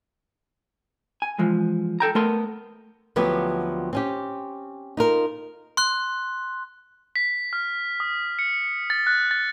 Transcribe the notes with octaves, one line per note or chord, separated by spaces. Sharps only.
G#5
E3 F3 G#3
A4 G5 A#5
A3 B3 A#4 C6
D2 F3 F#3 B3 C4 G4
C4 C#4 G4
D#4 F4 A#4
C6 F#6
B6
F6
D#6
C#7
A6
F#6
A6